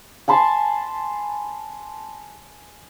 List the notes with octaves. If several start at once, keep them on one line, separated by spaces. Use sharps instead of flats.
G#5 A5 B5 C6